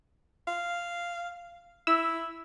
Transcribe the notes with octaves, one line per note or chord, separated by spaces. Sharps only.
F5
E4 E6